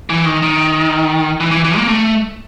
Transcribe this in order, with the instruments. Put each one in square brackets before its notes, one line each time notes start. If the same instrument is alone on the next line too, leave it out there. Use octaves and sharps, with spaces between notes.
[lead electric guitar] E3
D#3
D#3
E3
E3
E3
A#3
A3